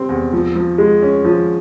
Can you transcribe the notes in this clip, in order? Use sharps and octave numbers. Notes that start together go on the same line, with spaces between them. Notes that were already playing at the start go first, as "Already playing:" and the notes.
Already playing: C3 G3 C4
E2
F3
F3
G#3
C#4
F3